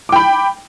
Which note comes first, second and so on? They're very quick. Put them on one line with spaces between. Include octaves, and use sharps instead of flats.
D6 G5 B5